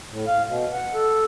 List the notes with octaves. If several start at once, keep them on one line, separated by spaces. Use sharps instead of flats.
A2
F5
B2
F#5
A4